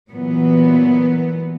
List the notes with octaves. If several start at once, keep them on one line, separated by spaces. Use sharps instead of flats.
A#2 E3 F#3 B3